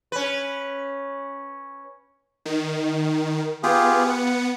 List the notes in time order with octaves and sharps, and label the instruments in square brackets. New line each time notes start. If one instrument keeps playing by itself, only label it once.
[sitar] C#4 B4
[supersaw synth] D#3
[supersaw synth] B3 [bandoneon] F4 G4 G#4
[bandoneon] F#5